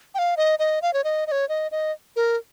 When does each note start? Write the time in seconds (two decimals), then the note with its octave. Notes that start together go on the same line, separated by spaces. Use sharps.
0.14 G5
0.19 F5
0.37 D#5
0.59 D#5
0.82 F5
0.93 C#5
1.04 D#5
1.27 D#5
1.32 C#5
1.49 D#5
1.71 D#5
2.16 A#4